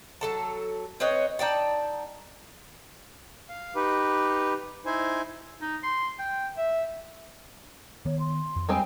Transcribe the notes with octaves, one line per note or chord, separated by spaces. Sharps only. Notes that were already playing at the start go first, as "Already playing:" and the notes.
F#3 A4 A5
C4 B4 C#5 D#5
D#4 D5 G5 A5
F5
D#4 G4 B4
D#4 E4 C5 G#5
D#4
C6
G5
E5
D#3 B3 C#5
C6
F2
G3 G#3 C4 G5